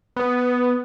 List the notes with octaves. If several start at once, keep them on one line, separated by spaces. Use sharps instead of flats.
B3